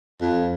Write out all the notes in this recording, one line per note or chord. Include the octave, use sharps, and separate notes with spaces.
F2